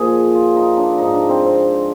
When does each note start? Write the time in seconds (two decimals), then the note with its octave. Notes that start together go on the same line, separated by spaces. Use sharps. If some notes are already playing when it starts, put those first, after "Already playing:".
Already playing: A#2 F3 G#4
0.35 F4
0.56 D#4
0.77 D4
0.97 G#2 F3 D#4
1.13 D4
1.29 C4
1.45 C4